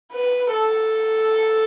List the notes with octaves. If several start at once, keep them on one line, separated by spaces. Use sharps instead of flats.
B4
A4